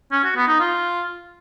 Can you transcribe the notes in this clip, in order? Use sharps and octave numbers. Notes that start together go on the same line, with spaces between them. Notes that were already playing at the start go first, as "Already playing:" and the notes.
C#4
F#4
B3
D#4
F4